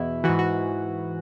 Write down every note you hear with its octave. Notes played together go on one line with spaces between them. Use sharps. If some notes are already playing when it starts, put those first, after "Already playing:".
Already playing: E2 B2 E4
G#2 E3 F#4
F#4